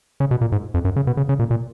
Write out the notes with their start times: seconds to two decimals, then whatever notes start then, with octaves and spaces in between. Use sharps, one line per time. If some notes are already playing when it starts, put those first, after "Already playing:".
0.20 C#3
0.31 B2
0.41 A#2
0.52 G#2
0.74 F2
0.85 F#2
0.96 C#3
1.07 B2
1.17 C#3
1.29 C#3
1.39 A#2
1.51 A#2